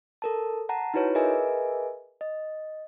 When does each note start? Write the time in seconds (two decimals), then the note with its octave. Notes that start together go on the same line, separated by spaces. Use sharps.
0.22 A4 A#4 A5
0.69 F#5 A5 A#5
0.94 D#4 E4 F#4 B4 C#5
1.15 G#4 A#4 B4 D#5 E5 G#5
2.21 D#5